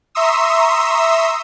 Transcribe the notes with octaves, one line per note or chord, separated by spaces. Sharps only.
E5 A#5 C6 C#6 D#6 E6